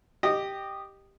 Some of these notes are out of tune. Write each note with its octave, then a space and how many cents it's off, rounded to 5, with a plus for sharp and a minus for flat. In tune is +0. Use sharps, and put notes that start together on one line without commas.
G4 +0 D#5 -15